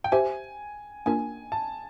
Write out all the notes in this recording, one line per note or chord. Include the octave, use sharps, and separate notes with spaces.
G5
G4 C5 E5 G#5
A#3 D4 F4 A#4 G#5
A5